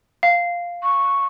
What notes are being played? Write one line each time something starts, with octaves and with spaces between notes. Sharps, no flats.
F5
C#6